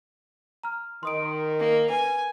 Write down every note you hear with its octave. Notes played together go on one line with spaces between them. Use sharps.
A#5 F6
D#3 C6 D#6 D7
A#3
B4 G#5